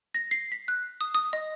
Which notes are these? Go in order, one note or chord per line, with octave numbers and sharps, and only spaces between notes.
A#6
C7
B6
F#6
D#6
D#6
D#5